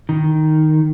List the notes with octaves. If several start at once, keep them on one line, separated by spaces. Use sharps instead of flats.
D#3